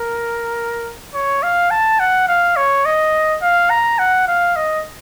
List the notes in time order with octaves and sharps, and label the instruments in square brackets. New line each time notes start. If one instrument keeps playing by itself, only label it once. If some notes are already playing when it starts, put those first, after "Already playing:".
Already playing: [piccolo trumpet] A#4
C#5
F5
A5
F#5
F5
C#5
D#5
F5
A#5
F#5
F5
D#5